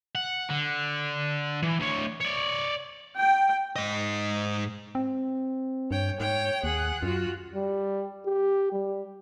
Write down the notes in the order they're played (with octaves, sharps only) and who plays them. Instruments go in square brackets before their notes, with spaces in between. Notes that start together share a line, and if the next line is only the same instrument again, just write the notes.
[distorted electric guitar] F#5
D3
E3
D2 C#5
C#5 D5
[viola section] G5
[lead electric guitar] G#2 D#5
[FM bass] C4
[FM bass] G2 [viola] C#5 G5
[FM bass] G#2 [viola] C#5 G5
[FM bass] D#2 [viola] G#4 F#5
[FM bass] F#2 [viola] F4 F#4
[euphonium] G3
G4
G3